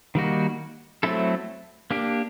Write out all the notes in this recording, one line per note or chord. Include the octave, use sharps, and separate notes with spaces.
D#3 G3 A#3 D#4 F#4
F#3 A3 C4 E4 A4
A#3 D4 G4